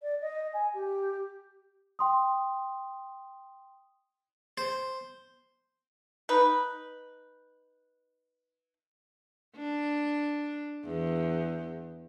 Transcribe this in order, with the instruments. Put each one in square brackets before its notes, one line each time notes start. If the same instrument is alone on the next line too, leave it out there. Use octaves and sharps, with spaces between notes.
[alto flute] D5
D#5
G#5
G4
[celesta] G5 C6 D#6
[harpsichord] C5
[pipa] D#4 B4
[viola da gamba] D4
E2